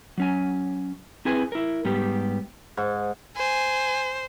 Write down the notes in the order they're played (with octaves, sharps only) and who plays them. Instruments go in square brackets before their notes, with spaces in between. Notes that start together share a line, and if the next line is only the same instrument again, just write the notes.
[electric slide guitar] F#3 C#4 G#5
C4 E4 G#4 B4 G#5
E4 A#4
G#2 G3 B3 G4
[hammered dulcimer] G#2
[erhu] C5 [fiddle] G#5